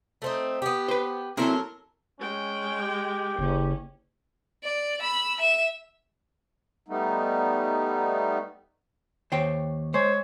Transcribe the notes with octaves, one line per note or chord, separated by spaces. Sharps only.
A3 C4 D#4
B3 G4
B4 C5
F#3 A#3 C4 E4 A4 A#4
G#3 C#4 G5
G4
F#1 C#4
D5
B5 E6
E5 E7
G3 A3 B3 D#4
D#2 C5 C#5 G5
G#3 C5 C#5